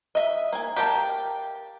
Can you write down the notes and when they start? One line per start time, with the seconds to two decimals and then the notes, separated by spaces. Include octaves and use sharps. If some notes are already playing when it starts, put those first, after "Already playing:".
0.15 D#5 E5
0.53 A#3 G#5
0.76 G4 A#4 F5 G5 A5